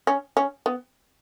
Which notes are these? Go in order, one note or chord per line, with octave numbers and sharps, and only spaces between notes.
C#4
C#4
B3